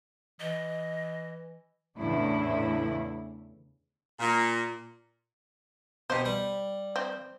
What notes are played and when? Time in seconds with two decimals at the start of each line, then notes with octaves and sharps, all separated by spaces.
0.40 E3 D#5
1.98 E2 A2 C#3 D4 E4
4.19 A#2
6.10 B2 G4 C5
6.25 G3
6.96 C4